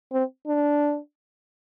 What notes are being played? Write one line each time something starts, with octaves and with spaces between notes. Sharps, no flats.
C4
D4